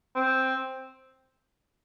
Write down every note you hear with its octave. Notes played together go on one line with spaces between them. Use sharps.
C4